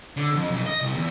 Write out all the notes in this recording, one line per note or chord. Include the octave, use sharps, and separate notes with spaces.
D3
F2
B1
D#5
C2
E2